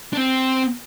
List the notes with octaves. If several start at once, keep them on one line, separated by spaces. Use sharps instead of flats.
D4
C4